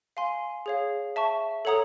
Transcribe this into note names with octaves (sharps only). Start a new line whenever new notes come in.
F5 G#5 C6
G#4 C#5 F5
E5 A5 C#6
A4 C#5 F#5 A#5 D#6